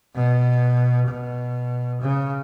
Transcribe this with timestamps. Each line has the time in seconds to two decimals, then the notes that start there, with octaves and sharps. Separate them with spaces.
0.15 B2
1.08 B2
2.02 C#3